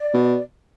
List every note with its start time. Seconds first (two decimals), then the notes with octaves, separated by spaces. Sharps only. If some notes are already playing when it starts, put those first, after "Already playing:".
Already playing: D5
0.14 B2